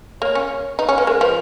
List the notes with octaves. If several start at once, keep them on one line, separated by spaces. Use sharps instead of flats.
A#3 C#5
C#4
D#4 B4
C#4 C#5
A#3 B4
G#3 A#4
F3 B4